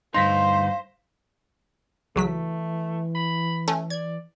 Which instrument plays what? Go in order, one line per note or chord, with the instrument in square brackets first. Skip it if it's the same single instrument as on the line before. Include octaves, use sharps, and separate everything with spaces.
[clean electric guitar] D2 G2 D#4 [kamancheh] C5 [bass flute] F5 [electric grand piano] C6 A#6 B6
[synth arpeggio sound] C#2 F#3 B6 [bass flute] E3 [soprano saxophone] A3
[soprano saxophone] B5
[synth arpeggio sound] A3 C#4
[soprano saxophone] D5 [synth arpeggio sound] G#6